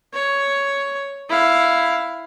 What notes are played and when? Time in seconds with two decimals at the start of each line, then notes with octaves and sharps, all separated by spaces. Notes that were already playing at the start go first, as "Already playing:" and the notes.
0.14 C#5
1.29 E4 F5